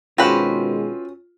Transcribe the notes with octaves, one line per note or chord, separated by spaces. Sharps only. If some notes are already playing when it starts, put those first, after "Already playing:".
B2 D#3 G#3 C4 C#4 F4 F#4 B4